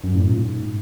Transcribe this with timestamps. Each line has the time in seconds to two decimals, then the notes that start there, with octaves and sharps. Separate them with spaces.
0.04 F#2
0.15 A2
0.26 A#2
0.38 G#2